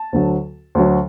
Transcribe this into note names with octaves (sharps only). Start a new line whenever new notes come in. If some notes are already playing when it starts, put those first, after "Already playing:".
Already playing: A5
D2 D3 F#3
D2 D3 F#3